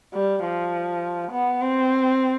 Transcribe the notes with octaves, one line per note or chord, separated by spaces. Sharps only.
G3
F3
B3
C4